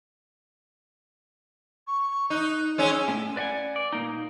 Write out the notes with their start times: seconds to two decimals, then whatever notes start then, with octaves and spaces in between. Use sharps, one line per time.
1.87 C#6
2.30 D#4 F#6
2.78 G#3 C#4 E6
3.08 A2 C#4
3.36 B4 D5 E5 F#5 G#5
3.76 D5
3.93 A#2 A#3 D#4